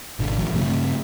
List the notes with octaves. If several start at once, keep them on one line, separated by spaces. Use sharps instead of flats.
G#1 B2 D3
A#1 E3 F#3
G2 C#3 A3 C4